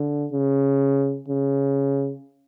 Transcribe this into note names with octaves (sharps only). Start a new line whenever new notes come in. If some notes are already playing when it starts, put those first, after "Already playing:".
Already playing: D3
C#3
C#3